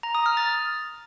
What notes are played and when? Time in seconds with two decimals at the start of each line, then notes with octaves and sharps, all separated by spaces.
0.03 A#5
0.15 D#6
0.26 F6
0.37 A6